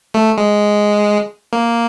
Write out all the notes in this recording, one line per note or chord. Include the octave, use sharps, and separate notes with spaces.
A3
G#3
A#3